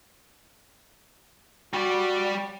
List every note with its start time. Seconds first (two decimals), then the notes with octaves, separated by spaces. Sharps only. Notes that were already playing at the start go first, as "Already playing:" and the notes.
1.74 G3 F#4 D5